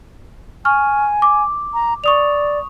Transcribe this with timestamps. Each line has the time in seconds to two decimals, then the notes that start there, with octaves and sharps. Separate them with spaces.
0.65 G#5 C#6 F6
1.22 D6
1.74 A#5
2.04 D5 C#6 D#6 F7